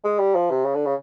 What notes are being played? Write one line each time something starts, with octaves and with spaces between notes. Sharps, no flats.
G#3
G3
F3
C3
C#3
D3
C#3